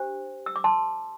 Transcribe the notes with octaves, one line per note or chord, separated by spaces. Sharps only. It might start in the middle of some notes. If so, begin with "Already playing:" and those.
Already playing: D4 G4 C5
E6
D6
A5 C6